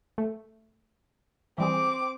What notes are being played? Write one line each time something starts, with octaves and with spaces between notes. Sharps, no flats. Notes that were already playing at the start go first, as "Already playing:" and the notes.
A3
E3 G3 C4 G#4 D6